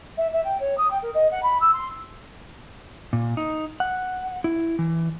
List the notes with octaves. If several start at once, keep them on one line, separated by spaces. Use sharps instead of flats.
E5
E5
G5
C#5
D#6
G5
A#4
D#5
F#5
B5
E6
C6
A#2
D#4
F#5
E4
E3